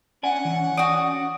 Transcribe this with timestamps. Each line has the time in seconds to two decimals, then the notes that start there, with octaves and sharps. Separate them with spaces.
0.23 C#4 D5 F#5 G#5
0.45 E3 C#4
0.77 F#4 D5 D#6